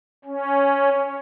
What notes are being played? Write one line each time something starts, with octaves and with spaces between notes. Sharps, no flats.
C#4